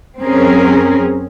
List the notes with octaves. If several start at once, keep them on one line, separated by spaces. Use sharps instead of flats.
F#2 C4 C#4 G#4 A#4